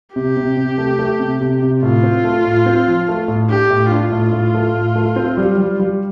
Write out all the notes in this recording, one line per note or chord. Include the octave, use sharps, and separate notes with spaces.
C3 G4
C3
C3
A3
A3
C3
C3
C3
A2 F4
C4
A3
A2
C4
F3
A3
A2
D4 G4
A2
D4 F4
A2
A2
A3
A2
A3
C4
G3
G3
G3